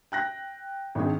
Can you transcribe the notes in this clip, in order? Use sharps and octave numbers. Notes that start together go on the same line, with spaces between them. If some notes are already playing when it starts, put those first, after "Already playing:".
G5 F#6 A#6
G#1 D#3 C4 D4 G#4